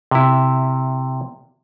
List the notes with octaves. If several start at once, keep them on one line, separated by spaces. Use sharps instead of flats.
C3 E4